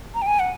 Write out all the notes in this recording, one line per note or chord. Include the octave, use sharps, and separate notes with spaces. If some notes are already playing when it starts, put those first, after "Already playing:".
A#5
G5
G#5
F#5